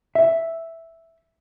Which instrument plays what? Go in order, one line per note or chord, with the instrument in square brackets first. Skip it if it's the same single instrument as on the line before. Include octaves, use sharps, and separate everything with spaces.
[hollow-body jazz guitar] E5